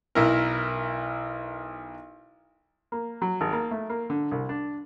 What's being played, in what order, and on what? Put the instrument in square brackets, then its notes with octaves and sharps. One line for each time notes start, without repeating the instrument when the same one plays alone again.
[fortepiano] B1 E4 A#4
A#3
F#3
G#1
A#3
A3
A#3
D3
C2
D4